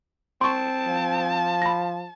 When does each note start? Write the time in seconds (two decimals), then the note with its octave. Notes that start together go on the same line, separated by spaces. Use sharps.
0.41 C4 A5 C6 C#6
0.89 F3
1.62 B5 A#6